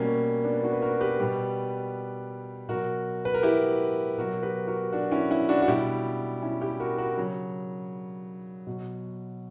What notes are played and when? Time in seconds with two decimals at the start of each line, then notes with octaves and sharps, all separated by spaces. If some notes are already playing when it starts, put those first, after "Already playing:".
Already playing: B2 G3 A#3 C#4
0.44 B3 D4
0.63 D4 F#4
0.73 B4
0.82 F#4 A#4
1.01 G4 B4
1.20 B2 G3
2.69 B2 F#3 F#4 A#4
3.25 B4
3.34 A#4
3.43 E4 G4
4.18 B2 F#3 F#4 A#4
4.43 G4 B4
4.68 F#4 A#4
4.92 D4 F#4
5.11 C#4 E4
5.30 C#4 E4
5.49 D4 F#4
5.62 F#4
5.68 B2 G3 E4 G4
6.42 C#4 E4
6.61 E4 G4
6.80 F#4 A#4
6.98 F#4 A#4
7.17 C#3 F#3
8.67 B2 F#3